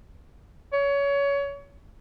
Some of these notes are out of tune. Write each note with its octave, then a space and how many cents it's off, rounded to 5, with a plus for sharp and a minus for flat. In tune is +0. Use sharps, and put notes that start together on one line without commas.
C#5 +25